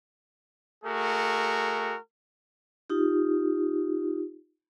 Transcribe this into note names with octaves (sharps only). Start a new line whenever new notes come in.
A3 F#4 G#4 A#4
D#4 F4 G4